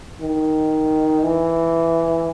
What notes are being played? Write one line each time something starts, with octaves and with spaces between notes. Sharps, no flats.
D#3
E3